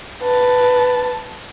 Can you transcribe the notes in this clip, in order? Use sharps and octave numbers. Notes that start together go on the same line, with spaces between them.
B4 A5